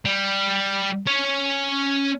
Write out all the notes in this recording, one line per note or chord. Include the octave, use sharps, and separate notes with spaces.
G3
C#4 C#5